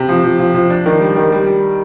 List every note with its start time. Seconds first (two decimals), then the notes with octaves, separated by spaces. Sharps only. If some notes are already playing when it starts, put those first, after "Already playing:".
Already playing: C3
0.09 F3
0.24 F3
0.39 F3
0.55 F3
0.70 D4
0.86 D#3
1.01 G3
1.16 D#3
1.32 G3
1.46 G3